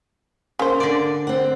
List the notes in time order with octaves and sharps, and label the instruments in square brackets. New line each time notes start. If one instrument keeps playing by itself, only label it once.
[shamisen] C#3 C5 [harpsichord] A#3
[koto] D3 D5
[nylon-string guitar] C4 F#5